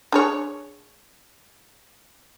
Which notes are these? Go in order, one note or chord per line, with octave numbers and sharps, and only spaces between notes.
D4 G#4 C#5